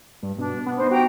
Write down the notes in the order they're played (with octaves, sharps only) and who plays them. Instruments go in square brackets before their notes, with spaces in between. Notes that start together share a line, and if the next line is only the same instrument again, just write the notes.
[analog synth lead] G2
[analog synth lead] B2 [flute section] D4
[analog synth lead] B3
[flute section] D#4 C5
[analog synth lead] F#4 [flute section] G4 G5 A#5